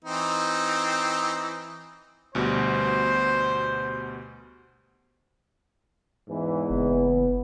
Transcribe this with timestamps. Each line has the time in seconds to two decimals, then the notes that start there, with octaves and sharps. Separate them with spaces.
0.05 E3 C4 D#4
2.35 D2 B2 G3 C5
6.29 E2 G#2 E3
6.70 F#1 B3